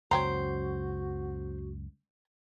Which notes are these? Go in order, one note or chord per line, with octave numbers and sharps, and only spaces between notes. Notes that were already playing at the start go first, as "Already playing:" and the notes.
C#2 F#2 F#4 C5 C#5 G5 A#5